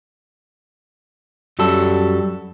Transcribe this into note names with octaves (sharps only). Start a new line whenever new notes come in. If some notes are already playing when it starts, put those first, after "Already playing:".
F#2 F#3 G3 A4